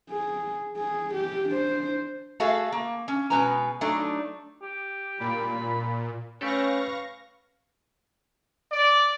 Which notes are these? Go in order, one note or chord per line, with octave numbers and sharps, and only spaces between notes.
G#4
G#4
G4
D4 C5
A3 F#4 G#4 A4 E5 F5
A#3
C#4
B2 G#3 C#4 B4 G#5 A#5
F#3 A3 D4 D#4
G4
A#2 B5
A3 C#4 G4 A4 B4 F5 C#6 A#6
D5